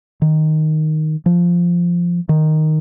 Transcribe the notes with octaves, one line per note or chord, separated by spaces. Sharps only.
D#3
F3
D#3